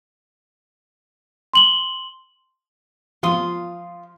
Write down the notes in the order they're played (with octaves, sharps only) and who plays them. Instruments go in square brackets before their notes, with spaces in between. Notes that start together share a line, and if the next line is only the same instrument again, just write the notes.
[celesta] C6 F#7 G7
[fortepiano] F3 [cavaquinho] F4 C6 D#6